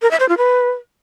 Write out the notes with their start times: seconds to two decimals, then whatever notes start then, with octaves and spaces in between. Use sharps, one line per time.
0.02 A#4
0.11 E5
0.20 C5
0.29 F4
0.38 B4